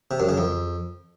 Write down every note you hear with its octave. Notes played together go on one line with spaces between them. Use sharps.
C3
F#2
C#3
F2